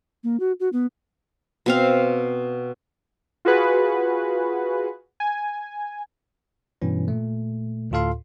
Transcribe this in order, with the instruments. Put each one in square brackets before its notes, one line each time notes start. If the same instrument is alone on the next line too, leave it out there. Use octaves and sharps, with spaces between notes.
[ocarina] A#3
F#4
F#4
B3
[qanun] B2 C4 F5
[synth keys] F4 F#4 G#4 B4
G#5
[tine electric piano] G2 B2 E3 C#4
A#2 A3
D2 A2 F4 A4 F5 C6